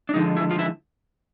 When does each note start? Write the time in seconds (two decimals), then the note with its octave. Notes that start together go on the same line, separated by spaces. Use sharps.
0.09 D4
0.14 D3 F3 G#3 D#4
0.37 E4
0.51 F4
0.59 E4